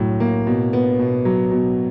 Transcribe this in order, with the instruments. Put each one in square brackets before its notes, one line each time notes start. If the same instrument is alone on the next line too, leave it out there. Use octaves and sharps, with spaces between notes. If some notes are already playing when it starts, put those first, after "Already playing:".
Already playing: [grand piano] A2 F#3
A#3
B2
B3
B2
F#3
B2